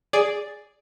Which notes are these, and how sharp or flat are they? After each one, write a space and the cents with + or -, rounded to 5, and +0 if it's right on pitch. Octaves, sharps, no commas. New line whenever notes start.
G#4 +0 D5 +0